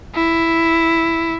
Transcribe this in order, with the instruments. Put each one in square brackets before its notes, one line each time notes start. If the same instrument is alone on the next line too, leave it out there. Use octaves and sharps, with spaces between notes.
[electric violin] E4